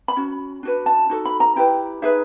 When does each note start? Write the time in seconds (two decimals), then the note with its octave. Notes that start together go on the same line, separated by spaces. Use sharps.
0.08 B5
0.17 C#4 F#4
0.63 D4 F#4 B4
0.86 A5
1.10 D#4 F#4 A4
1.25 B5
1.40 A#5
1.56 E4 G4 B4 G5
2.02 D#4 G#4 B4 E5